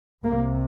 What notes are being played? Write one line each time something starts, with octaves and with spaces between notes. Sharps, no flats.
C2 C3 A#3